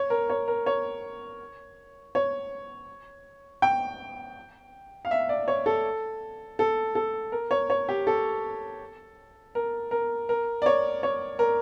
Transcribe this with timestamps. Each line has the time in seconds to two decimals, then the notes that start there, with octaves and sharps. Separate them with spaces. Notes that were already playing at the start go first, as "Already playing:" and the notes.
Already playing: C#5
0.10 A#4
0.30 C#5
0.48 A#4
0.66 C#5
2.15 C#5
3.62 G5
5.05 F5
5.11 E5
5.29 D5
5.48 C#5
5.66 A4
6.59 A4
6.95 A4
7.32 A#4
7.51 C#5
7.70 C#5
7.89 G4
8.07 A4
9.55 A#4
9.91 A#4
10.29 A#4
10.62 D5
10.66 C#5
11.03 C#5
11.39 A#4